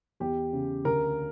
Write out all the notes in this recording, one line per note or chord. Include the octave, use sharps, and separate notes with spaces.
E2 G4
C#3
D2 A#4